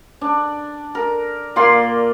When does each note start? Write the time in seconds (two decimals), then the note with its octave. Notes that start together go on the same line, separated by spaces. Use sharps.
0.21 D4
0.95 A#4
1.56 A#2 A#3 D5 C6